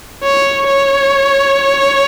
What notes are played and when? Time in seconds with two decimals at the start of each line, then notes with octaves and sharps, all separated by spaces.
0.23 C#5
0.67 C#5